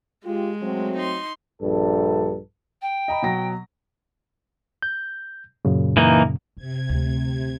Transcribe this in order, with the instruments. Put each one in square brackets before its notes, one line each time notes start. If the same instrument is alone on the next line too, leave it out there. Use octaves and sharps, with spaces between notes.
[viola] G#3 [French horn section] F4 G4
[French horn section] F#3 A3 C4
[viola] D#4 C6
[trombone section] A#1 G2 A4
[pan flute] G5
[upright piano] D#5 A#5 B5
B2 F#3 A#6
[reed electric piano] G6
F#2 A#2 C#3
[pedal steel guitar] E3 A#3 D#4
[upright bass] F#2 [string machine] C3 G#6
[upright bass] D2 A3